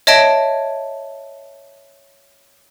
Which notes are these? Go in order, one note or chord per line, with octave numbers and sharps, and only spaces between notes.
C#5 D#5 E5 A5 G#6 D7